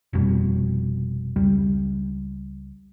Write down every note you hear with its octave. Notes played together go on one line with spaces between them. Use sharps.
F1 F2 B2 G3
C#2 G3